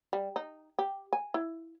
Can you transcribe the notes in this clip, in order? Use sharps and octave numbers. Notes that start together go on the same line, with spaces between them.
G3
D#4
G4
G#5
E4